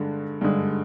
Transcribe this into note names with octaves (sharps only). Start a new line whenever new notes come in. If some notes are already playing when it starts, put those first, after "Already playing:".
Already playing: G2 D3 G#3
G2 D3 G#3